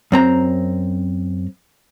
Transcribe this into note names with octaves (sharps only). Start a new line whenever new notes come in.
F#2 C4 A#5